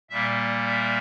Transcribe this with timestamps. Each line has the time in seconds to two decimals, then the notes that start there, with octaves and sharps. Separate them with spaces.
0.10 A#2 G3 A#3 E5
0.67 E5